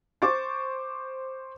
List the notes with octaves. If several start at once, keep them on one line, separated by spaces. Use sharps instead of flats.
C5 C#6 D6 A6